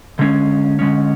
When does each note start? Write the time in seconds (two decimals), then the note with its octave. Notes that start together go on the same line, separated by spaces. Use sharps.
0.19 D3 G#3 C#4
0.79 D3 G#3 C#4